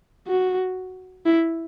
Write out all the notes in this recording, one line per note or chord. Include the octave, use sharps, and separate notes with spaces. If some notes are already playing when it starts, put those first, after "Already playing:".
F#4
E4